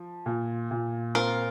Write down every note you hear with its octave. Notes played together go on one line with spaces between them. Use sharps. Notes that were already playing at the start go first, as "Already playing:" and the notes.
Already playing: F3
A#2
A#2
C4 F4 A#4